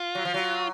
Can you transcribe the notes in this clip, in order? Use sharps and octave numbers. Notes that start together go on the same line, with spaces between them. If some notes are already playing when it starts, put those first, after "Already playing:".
Already playing: F4
F#3
F3
F#3